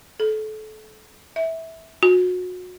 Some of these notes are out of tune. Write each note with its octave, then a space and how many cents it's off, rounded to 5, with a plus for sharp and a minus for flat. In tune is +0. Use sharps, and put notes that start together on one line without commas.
A4 -30
E5 -15
F#4 -30